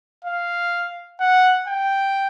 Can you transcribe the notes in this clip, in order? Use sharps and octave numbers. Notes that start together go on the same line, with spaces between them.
F5
F#5
G5